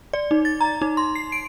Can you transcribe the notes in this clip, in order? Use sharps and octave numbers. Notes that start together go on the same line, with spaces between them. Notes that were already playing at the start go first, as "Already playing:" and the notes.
D5
D#4
A6
A#5
D#4
C6
C7
D7